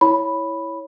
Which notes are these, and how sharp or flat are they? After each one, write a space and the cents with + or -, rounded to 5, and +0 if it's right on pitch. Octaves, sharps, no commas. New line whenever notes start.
E4 +0 C#5 +0 B5 +0